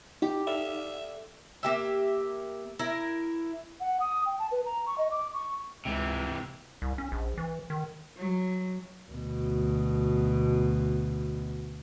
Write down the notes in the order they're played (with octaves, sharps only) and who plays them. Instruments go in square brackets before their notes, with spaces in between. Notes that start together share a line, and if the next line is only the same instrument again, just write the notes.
[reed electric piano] D#4 [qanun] G4
[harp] A4 D5 F5 [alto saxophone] E5
[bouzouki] A#3 G4 E5
E4 A#4
[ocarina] F#5
D#6
G5
A5
B4
A#5
C#6
D#5
D6
C#6
[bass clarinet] C#2 [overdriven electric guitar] C3 E3
[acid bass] C2
C#4
A#1
E3
D#3
[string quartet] F#3
[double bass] D2 B2